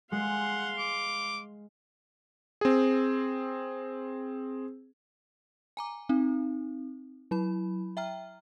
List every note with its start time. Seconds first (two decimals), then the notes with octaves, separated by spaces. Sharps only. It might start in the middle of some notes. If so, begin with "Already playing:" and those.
0.12 G#3 F5 F#5 C6
0.78 D6
2.61 C4 G#4
5.77 G#5 A#5 D6
6.09 C4 D#4
7.31 F#3 E4 B5
7.97 E5 G5 A#5 F6